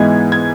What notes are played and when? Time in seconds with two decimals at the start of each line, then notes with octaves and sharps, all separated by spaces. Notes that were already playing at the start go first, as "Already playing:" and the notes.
Already playing: G#2 E3 G#3 B3 D#4 G#6
0.32 G#6